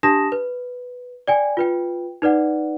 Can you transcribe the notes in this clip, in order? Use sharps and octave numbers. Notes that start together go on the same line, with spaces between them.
D4 G4 A5 D#6 A#6 E7
B4
D5 G5 G#5
F4 B4 G5
D#4 B4 D5 F#5